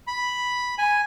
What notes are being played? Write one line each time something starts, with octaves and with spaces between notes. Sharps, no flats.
B5
G#5